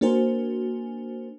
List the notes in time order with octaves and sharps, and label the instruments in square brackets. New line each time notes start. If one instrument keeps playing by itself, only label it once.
[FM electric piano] A#3 D4 F#4 A#4 C5 G#5